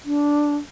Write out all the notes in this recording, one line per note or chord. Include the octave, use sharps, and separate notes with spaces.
D4